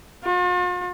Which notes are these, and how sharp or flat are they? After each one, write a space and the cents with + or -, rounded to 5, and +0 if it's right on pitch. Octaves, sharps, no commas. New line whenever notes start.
F4 +45